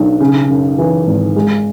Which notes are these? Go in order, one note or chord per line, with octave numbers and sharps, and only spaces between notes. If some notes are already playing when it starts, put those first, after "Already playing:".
Already playing: B1 D4
C#3
F#2
E3
G#1
G#3